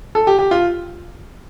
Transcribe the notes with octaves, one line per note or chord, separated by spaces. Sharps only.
A4
G4
G4
F4